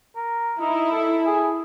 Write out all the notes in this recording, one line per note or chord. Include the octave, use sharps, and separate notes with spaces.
A#4
D#4 E4
A4
G#4